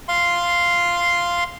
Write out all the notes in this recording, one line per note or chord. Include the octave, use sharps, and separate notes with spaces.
F5 C6